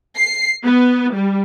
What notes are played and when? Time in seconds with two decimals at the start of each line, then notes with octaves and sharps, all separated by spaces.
0.17 C7
0.64 B3
1.13 G3